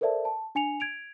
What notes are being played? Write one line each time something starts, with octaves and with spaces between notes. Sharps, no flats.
A4 A#4 C5 D5 E5 A5
A5
D4 G#5 C#7 F7
G#6 D7 F7